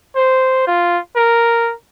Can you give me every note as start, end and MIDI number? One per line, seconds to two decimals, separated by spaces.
0.16 0.63 72
0.67 0.99 65
1.16 1.73 70